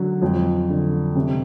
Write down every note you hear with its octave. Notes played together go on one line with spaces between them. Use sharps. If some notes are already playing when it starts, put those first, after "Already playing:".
Already playing: D3 F#3
F2
D3
C3